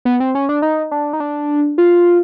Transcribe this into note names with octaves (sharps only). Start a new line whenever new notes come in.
B3
C4
C#4
D4
D#4
D4
D#4
D4
F4